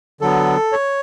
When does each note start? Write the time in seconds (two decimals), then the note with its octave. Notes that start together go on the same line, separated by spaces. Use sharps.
0.21 D3 F#3 B3 A4
0.72 C#5